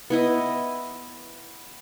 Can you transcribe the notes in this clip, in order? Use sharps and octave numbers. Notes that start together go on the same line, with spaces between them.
B3 E4 D#5